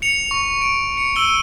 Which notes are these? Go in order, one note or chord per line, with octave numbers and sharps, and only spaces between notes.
C#7 F7
C#6
D7
C#7
E6 D#7 G7